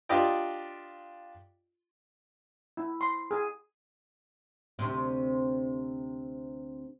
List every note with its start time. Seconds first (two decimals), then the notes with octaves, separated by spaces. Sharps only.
0.09 D4 F4 G4 D5 D#5 G5
2.77 E4
3.01 C6
3.31 G#4
4.79 D2 C3